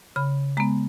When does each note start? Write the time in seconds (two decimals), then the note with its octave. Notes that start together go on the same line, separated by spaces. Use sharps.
0.16 C#3 B5
0.57 G#3 B3 A#5